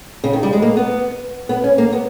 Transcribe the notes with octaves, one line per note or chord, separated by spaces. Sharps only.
C#3
D#3
G3
G#3
A#3
B3
B3
C#4
A#3
B3